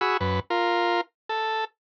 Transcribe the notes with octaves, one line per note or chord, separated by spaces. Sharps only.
F#4 G#4 B5 E6
F#2 B4
F4 A#4
A4